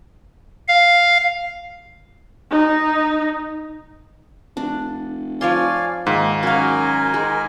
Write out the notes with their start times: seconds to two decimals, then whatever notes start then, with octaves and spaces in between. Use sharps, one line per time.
0.68 F5
2.51 D#4
4.57 F1 D4
5.41 F3 C#5 D5 F5 G#5 C6
6.06 G#2 D#3 A#3
6.43 F#2 F#4 A#4 F5 G#5
7.14 D#3 G#3